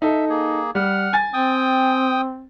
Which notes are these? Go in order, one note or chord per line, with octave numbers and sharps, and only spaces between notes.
D#4 A4 E5
A#3 G#4
G3 F#5 F6
G#5 A6
C4 G5 D#6